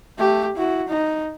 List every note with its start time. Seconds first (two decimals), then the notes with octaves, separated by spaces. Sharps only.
0.18 A3 G4
0.56 E4 F#4
0.88 D#4